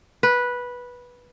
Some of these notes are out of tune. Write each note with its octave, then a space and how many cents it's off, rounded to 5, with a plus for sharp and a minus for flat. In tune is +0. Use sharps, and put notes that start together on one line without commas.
B4 -10